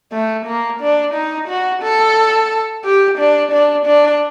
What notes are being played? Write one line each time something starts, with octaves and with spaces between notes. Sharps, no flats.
A3
A#3
D4
D#4
F#4
A4
G4
D4
D4
D4